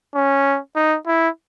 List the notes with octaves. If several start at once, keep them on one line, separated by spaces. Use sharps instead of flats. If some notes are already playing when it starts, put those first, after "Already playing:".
C#4
D#4
E4